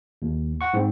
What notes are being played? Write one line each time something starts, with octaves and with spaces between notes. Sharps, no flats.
D#2
F#5 C#6
G#2 C4